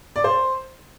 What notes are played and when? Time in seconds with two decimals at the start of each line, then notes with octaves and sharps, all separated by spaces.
0.16 D5
0.24 C5